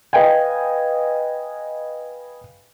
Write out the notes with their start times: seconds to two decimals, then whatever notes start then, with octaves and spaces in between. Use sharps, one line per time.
0.13 B4 D#5 F5 G5 G#5